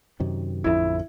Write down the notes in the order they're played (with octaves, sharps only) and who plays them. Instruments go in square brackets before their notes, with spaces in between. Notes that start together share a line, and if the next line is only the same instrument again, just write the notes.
[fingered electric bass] F#2 C3 D#3
[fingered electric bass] A1 F2 D3 [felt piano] E4